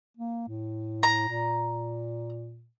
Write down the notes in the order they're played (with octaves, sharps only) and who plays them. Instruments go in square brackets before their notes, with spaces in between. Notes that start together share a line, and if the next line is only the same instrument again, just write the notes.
[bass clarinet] A#3
A2
[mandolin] A#5
[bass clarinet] A#2